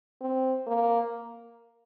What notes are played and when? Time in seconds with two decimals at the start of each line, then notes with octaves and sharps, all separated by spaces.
0.21 C4
0.67 A#3